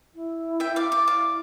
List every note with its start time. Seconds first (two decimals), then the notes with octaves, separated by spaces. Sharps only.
0.14 E4
0.60 E5 G5
0.76 D5 F5
0.92 D5
1.07 E4 D5 F5